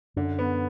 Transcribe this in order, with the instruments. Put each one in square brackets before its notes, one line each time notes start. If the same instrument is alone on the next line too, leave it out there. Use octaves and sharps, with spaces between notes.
[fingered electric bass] F#2 [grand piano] D3
[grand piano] B3